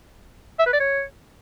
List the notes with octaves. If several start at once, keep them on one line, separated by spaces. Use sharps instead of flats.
E5
B4
D5
C#5